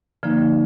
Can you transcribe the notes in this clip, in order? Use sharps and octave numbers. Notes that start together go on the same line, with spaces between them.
D3 F3 A#3 D#4